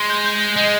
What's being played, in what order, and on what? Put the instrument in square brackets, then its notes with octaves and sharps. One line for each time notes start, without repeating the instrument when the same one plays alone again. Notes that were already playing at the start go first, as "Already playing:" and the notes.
Already playing: [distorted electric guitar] G#3 [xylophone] C6
[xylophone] G6
G6
G6
[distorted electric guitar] G#3 [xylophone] D#5